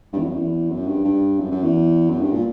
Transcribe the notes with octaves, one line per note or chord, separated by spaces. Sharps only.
G2
E2
F#2
E2
F#2
G2
G2
F#2
F#2
E2
F#2
G2
A#2